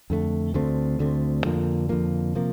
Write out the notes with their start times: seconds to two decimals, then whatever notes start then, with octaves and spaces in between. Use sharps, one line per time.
0.10 F2 D3 A3
0.54 D2 D3 A3 C4
0.99 D2 D3 A3 C4
1.44 F2 D3 F3 A#3
1.89 F2 D3 F3 A#3
2.35 C3 F3 A#3